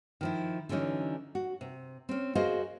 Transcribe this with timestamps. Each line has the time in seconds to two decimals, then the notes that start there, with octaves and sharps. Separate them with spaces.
0.21 D#3 F3 E4
0.69 D3 E3 F#3 C#4 D#4
1.35 F#4
1.61 C3
2.09 C4 C#4
2.35 F#4 G#4 A#4 C5 D#5 F5